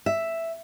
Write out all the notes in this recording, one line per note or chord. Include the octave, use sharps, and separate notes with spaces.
E5